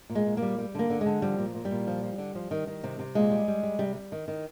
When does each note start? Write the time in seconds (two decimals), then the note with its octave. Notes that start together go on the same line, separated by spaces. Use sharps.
0.10 A#2
0.15 G#3
0.26 A#2
0.37 A#3
0.42 G3
0.58 G3
0.75 D3 A#3
0.90 D3
1.01 D3 G#3
1.22 F3 G3
1.38 A#2
1.55 A#2
1.65 G3
1.71 A#2
1.87 F3
2.03 F3
2.18 D3
2.35 F3
2.51 D#3
2.67 D#3
2.84 C3
2.99 C3
3.15 A#2 G#3
3.31 G3
3.48 G3
3.63 G3
3.79 C3 G3
3.95 G3
4.12 D#3
4.28 D#3